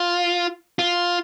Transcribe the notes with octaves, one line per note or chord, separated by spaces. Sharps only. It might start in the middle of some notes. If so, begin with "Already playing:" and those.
Already playing: F4
F4